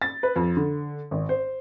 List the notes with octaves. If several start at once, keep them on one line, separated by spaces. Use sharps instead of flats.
A6
B4
F2
D3
G#1
C5